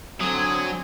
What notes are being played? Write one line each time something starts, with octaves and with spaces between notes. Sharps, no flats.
D3 F#3 C4 G#5 D#6 G#6